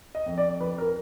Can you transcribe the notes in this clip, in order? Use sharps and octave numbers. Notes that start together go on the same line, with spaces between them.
D#5
F2
D5
F3 B4
A#4